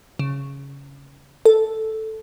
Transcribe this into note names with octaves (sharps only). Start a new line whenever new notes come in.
C#3
A4